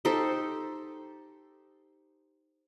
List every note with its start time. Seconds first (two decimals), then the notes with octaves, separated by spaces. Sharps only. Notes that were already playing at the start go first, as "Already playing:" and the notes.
0.05 D#4 G4 A4 C5